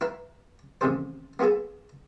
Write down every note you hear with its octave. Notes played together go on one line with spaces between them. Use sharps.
E4 B4 F5 A#5
A1 D#2 C3 A4 C5
A#3 B3 F4 G#4 A4